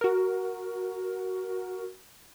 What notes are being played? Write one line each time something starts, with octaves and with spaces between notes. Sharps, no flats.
F#4 A#4